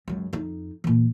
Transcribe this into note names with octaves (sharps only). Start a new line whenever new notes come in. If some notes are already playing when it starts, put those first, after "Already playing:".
C#2 F#2
F2 D#4
A#2 E3